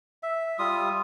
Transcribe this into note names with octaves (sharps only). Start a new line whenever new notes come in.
E5
G3 F4 D#6